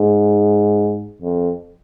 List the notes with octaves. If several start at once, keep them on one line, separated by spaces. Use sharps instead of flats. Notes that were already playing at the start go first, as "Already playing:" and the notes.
Already playing: G#2
F2